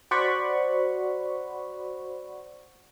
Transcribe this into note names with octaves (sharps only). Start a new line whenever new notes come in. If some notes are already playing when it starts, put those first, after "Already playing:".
F#4 C5 D5 F#5 B5 C#6